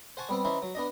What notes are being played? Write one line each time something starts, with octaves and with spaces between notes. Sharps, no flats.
C5 F#5 G#5 A5 C#6
G3 B3 C4
E3 C#4 D#4 E4 C5
F#3
B3 D4 D#5